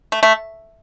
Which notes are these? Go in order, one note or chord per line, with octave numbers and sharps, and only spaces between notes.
A3
A3